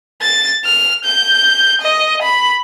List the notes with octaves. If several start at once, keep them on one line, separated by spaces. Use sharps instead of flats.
A6
F6
G6
D#5
B5